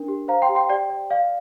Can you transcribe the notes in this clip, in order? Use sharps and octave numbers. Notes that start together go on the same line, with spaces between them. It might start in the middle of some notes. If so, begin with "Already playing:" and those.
Already playing: D4 A#4
G4
C5 F5 A#5
G5 C6
G4
G5 C6
G4 D5 G5
D5
D5 F5